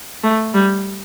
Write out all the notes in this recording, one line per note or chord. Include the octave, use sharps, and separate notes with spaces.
A3
G3